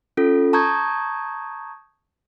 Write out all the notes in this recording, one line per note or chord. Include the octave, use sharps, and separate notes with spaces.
C#4 F4 A4
A5 A#5 C#6 D#6 G6 G#6